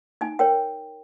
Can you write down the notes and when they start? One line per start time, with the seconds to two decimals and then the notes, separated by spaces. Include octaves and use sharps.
0.21 D#4 G#5
0.39 A#4 C#5 G5